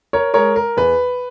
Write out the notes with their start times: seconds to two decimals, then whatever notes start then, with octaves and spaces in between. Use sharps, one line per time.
0.13 A#4 C#5
0.34 G#3 A#4 C#5
0.56 A#4
0.77 E2 B4